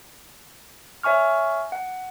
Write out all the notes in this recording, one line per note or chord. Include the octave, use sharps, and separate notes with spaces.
C#5 E5 G#5 C#6 F6
F#5